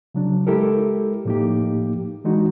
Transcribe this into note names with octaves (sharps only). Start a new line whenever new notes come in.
C#3 F#3 D4
G#3 E4 G4 A4 A#4
A2 F3 A#3 D#4 G4
E3 G#3 D4 D#4 F#4